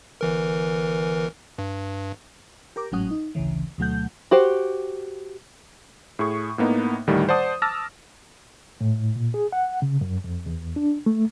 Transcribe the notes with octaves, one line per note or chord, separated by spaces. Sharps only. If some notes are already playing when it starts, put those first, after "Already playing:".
G1 E3 A#4
G2
G4 A#4 D6
G#1 A2 F#3 C#4 F#5 D#6
D#4
A1 D2 C#3 E3
D2 B2 F#3 A3 F#5 G6
F#4 G4 C5
A2 G#4 C#6
A2 A#3 B3 D#4
D2 A2 D#3 G3
C5 D5 F#5 A5 D#6
A5 D6 E6 F6 A6 A#6
A2
A#2
G#4
F#5
C#3
F#2
F2
E2
D4
A3